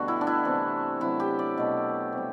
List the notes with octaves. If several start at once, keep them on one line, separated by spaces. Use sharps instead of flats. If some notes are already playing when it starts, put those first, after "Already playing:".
Already playing: B2 D3 G3 A3 F#4
E4
D4
E4
C3 E3 A3
C3 F#3 A3 E4
G4
D5
B2 A3
C3
G3